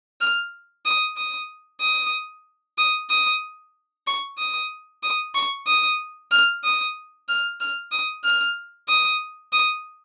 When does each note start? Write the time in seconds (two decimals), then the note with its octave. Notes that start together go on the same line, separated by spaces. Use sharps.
0.21 F6
0.85 D#6
1.17 D#6
1.81 D#6
2.78 D#6
3.10 D#6
4.07 C#6
4.38 D#6
5.03 D#6
5.35 C#6
5.67 D#6
6.32 F6
6.64 D#6
7.29 F6
7.61 F6
7.92 D#6
8.24 F6
8.89 D#6
9.53 D#6